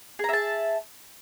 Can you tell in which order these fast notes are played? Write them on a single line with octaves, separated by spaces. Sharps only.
G#4 A#5 E5 A5